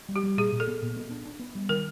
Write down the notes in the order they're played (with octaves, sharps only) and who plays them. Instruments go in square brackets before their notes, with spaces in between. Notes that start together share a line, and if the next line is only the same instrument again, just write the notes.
[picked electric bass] G3
[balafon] G4
[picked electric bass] G3
[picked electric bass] A#2 [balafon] G#4
[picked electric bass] A#2
[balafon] A4
[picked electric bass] B3
A#2
B3
D4
D4
B3
G3
[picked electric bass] D#3 [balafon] A#4